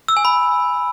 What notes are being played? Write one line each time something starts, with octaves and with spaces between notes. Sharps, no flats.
E6
G#5
B5